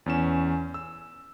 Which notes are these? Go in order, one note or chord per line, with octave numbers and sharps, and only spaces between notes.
E2 C#4 E7
E6